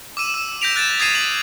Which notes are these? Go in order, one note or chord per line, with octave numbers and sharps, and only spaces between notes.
D6 E6 D#7 E7
E6
G6 A#6 B6 D7 F7
F#6 A6 D7 E7
D#6 G#6 A6 C7 D#7 E7
F#7